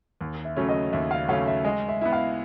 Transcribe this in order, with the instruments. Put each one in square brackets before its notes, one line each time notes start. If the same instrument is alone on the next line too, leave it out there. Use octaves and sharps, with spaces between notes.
[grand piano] D#2
[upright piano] E5
[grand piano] C#3 F#3 A3 C#4
[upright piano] D#5
[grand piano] D#2 [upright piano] E5
[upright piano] F5
[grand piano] C#3 F#3 A3 C#4 [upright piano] F5
[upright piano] E5
[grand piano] G#3 [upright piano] D#5
[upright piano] E5
[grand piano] B3 E4 [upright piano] E5
[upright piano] F5